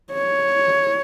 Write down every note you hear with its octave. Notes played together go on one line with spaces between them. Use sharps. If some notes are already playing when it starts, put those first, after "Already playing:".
C#5